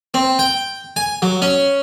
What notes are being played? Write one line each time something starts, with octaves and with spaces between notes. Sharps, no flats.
C4
G5
G#5
F#3
C#4